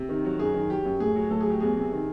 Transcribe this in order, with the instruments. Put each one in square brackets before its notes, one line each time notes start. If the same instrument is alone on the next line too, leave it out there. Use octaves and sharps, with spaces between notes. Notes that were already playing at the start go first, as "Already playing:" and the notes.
Already playing: [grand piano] C3
D#3
F#3
F#2 G#4
D#3
F#3 G4
F#2
A2 G#4
F#3
A2 A4
G#4
F#3 G4
E2 G#4
C3
D#3